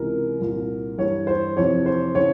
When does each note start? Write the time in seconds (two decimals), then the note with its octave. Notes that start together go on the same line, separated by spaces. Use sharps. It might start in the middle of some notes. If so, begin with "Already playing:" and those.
Already playing: C#2 C3 E3 A#4
0.39 C2 A#2
0.98 G2 E3 C#5
1.27 C5
1.57 F2 C3 E3 C#5
1.86 C5
2.15 C#3 E3 C#5